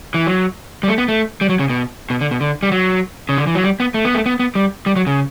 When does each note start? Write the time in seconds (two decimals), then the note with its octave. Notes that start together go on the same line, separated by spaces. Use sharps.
0.14 E3
0.27 F#3
0.83 G3
0.88 A3
0.98 B3
1.08 A3
1.41 G3
1.49 F#3
1.59 C#3
1.70 B2
2.10 B2
2.21 D3
2.31 B2
2.41 D3
2.63 G3
2.72 F#3
3.29 C#3
3.38 D3
3.47 E3
3.55 F#3
3.64 G3
3.80 B3
3.94 A3
4.05 B3
4.15 A3
4.26 B3
4.39 B3
4.55 G3
4.86 G3
4.96 F#3
5.07 C#3